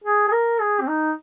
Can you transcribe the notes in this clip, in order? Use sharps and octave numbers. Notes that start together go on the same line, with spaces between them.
G#4
G#4
A#4
G#4
C4
D#4